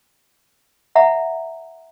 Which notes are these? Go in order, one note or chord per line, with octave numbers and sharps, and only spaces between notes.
E5 F#5 A#5